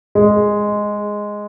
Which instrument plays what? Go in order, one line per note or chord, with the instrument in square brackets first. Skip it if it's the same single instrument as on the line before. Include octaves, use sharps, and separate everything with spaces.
[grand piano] G#3